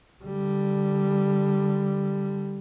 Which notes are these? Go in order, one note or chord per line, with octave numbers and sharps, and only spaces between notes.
D3 G3